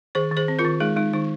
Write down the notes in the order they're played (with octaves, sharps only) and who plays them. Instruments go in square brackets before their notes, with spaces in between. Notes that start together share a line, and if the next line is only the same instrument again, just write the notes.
[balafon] D#3 G#4 C5
D#3
G#4 C5
C4
F4 A#4
D#3
G#3 D#4 G#4
G#3 D#4
D#3 D#4